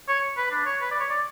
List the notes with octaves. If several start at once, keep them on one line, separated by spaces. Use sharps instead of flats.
C#5
B4
D4
C#5
B4
D5
C#5
D5